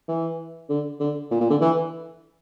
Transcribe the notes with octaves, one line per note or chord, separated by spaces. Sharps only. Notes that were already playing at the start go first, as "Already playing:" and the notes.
E3
D3
D3
A#2
A#2
D3
E3